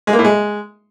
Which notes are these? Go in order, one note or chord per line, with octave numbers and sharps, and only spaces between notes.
G#3
A#3
A2
G#3